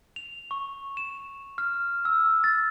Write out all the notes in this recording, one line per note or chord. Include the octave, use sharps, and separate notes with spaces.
F7
C#6
E7
F6
E6
A6